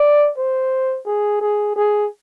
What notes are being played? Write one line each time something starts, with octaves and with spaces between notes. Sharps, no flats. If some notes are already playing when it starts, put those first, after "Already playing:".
Already playing: D5
C5
G#4
G#4
G#4